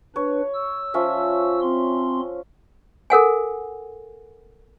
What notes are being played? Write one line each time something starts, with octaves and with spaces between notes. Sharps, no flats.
D4 B4 C#5
E6
F3 C#4 E5
C4 C6
A4 A#4 F#5 G#5